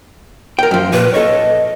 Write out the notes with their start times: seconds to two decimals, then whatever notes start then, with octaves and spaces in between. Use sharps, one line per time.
0.59 A#4 G5
0.71 F#2 F3
0.93 A#2 B4
1.14 A4 C#5 D#5